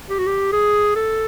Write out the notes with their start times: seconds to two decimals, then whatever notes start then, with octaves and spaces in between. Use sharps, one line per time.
0.10 G4
0.18 F#4
0.27 G4
0.53 G#4
0.96 A4